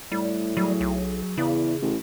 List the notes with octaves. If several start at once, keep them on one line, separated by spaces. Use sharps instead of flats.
A2 G3
F#3 G3 G#4
B1
E2 C#3 E4 D5
A1